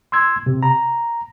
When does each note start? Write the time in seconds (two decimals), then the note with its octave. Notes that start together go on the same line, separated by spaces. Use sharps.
0.12 C6 E6 G#6
0.46 C3
0.63 A#5